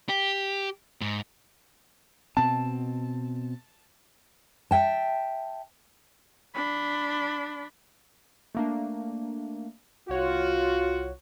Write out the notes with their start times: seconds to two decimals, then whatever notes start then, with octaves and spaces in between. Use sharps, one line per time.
0.09 G4
1.01 G#2
2.37 B2 C4 A5
4.71 E5 G5 A5
6.55 D4 B5
8.55 A3 A#3 D4
10.09 C2 F4 F#4 C#5